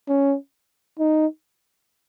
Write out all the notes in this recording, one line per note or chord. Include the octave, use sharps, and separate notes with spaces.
C#4
D#4